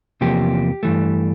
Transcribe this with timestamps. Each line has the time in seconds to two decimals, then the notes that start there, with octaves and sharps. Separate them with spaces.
0.21 E2 C3 F3 A#3 G4
0.83 G2 E3 A3